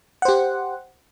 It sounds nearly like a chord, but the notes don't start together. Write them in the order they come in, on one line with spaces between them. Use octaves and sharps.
F#5 C5 G4